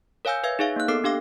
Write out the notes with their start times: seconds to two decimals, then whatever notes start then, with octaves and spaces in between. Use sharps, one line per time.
0.25 A#4 C#5 F5 G#5 E6 G6
0.43 B4 E5 F5 E6 G#6
0.59 D#4 G#4 C#5 E5 F5
0.76 A#3 F#6
0.88 B3 A4 A#4 D6 C7
1.04 D4 G4 F5 D6